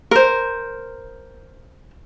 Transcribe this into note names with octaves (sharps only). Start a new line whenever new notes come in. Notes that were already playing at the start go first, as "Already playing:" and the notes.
A#4 C5